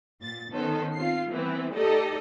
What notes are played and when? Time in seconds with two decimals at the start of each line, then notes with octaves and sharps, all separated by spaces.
0.20 A#2 A6
0.52 D#3 B3 C#4 A4 C5
0.94 C4 F4 C7
1.30 E3 G3 B3 C4 E4
1.74 A3 D#4 G4 A4 D5 D#5